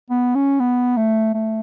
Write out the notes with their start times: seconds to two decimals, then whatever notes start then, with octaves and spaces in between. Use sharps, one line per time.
0.10 B3
0.35 C#4
0.60 B3
0.97 A3
1.34 A3